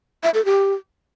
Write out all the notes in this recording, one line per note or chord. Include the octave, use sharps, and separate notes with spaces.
E5
A4
G4